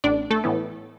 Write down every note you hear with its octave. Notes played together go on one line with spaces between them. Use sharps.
A1 D4 D5
A3 A4
A2 E3 B3